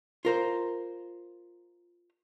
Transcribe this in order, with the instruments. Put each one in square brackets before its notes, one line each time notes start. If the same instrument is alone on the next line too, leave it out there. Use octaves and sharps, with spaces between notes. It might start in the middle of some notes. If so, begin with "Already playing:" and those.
[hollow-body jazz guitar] F4 A#4 C5